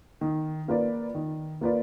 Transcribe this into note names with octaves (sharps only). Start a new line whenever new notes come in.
D#3
A#3 F4 B4 D5
D#3
A#3 F4 B4 D5